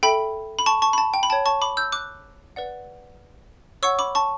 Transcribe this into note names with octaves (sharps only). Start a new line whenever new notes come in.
A4 E5 G5 B5
B5
A5 C#6
A5 C#6
B5
A5
G5
B5
C#5 G5 A5
A5 C#6
B5 D6
E6 G6
D6 F#6
B4 D5 F#5
C#5 F#5 C#6 E6
B5 D6
A5 C#6